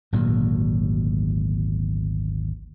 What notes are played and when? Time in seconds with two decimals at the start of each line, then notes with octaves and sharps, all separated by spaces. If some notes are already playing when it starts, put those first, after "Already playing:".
0.13 G#1 D2 A#2 F#3